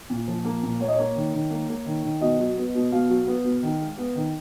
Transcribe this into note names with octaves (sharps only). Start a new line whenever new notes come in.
A#2
F3
A#3
A#2
A#3 C#5
D#5
A#3 C#5
D#3
D#3
A#3
A#3
D#3
D#3
B2 D#5
F#3
B3
B2
B2 F5
F#3
B3
B2
D#3
G#3
B3
D#3